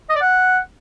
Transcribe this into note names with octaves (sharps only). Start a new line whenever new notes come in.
D#5
D5
F#5